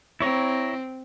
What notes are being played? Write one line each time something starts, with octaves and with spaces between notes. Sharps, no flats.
C4 E4 C#5 A#5